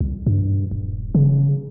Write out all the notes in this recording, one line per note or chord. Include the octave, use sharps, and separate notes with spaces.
C2
G2
D#1
C#3